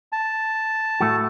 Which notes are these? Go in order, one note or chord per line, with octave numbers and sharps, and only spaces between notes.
A5
A2 A3 F#4